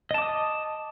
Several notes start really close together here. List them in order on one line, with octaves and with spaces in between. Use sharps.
D#5 A5 D6 D#6